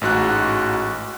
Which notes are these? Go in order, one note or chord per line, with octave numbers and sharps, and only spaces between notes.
A1 G#2 F#4 F#6